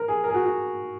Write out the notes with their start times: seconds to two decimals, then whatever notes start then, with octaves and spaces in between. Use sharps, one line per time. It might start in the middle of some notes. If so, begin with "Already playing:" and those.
Already playing: A#4
0.08 G#4
0.24 A#4
0.29 G#4
0.34 F#4
0.45 F#4